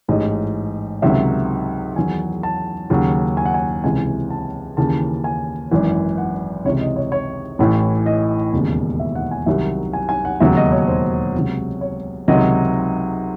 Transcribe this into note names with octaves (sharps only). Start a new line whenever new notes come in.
A1 G#2 E3 D#5
C#2 C3 D#3 F#3 E5
E2 D#3 F#3 G#5
A5
D#2 C#3 F#3
G#5
F#5
G#5
C#2 C3 E3 G#5
A5
D#2 C#3 E3 A5
G#5
G#1 F#2 E3
F#5
C#2 C3 E3 C#5
D#5
C#5
C#5
A1 A2 E3
D#5
E1 D#2 C#3
E5
F#5
G#5
C2 C3 D#3 F#3 E5
G#5
G#5
F#5
E1 D#2 C#3 F#3 E5
D#5
C#5
C5
C#2 C3 F#3
C#5
C#2 C3 D#3 F#3 D#5